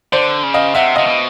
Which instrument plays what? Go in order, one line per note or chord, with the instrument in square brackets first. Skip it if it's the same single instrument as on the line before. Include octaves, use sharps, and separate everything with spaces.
[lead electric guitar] D3 [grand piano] C5 D5
[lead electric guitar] C#3
[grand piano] D#5 F5
[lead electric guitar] C3 [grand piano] E5 F#5
[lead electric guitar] C3 [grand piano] D#5 F5
[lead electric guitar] B2